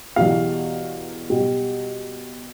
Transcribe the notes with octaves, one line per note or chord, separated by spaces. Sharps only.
E2 B2 G3 F5
B2 G3